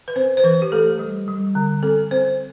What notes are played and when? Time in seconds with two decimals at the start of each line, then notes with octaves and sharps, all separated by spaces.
0.08 B4
0.16 C4 C5
0.37 C5
0.44 E3 B4
0.62 G4
0.72 A3 A4
0.99 G3
1.28 G3
1.55 D3
1.83 C4 A4
2.11 C4 C5